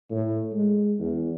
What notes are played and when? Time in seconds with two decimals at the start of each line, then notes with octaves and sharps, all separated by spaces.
0.11 A2
0.52 G#3
0.99 E2